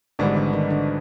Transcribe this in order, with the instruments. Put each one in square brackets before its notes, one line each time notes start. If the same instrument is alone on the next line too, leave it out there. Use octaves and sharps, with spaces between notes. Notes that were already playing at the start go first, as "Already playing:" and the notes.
[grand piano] G#1 G#2 E3 G3 B3 [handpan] D3 D4
[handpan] D3 D4
D#3 D#4
D3 D4